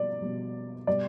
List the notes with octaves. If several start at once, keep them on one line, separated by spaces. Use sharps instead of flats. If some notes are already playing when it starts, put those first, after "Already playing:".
Already playing: B2 G3 D5
B2 G3
B2 G3 D5